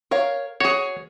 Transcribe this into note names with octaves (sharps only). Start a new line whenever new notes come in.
A#4 C#5 F5
F#4 G#4 C#5